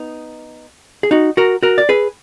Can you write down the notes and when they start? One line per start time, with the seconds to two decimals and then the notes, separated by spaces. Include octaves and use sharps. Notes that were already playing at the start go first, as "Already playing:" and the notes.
Already playing: B3 D#4
1.03 G#4
1.11 D#4 F#4
1.37 F#4 A#4
1.63 F#4 A#4
1.78 D5
1.89 G#4 B4